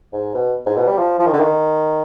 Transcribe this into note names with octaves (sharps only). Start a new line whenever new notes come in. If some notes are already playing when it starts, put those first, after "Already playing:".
G#2
B2
G#2
B2
G3
F3
F3
D#3
D3
D#3